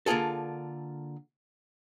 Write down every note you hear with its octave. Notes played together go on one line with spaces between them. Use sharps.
D3 A#3 F4 G#4 A4